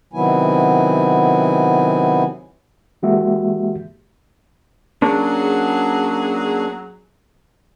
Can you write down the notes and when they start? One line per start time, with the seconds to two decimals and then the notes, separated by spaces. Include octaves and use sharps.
0.13 C3 D#3 F#3 B3 E4 G#5
3.03 E3 G#3 A#3 F#4 G4 E5
5.02 F#3 A#3 C#4 D4 G#4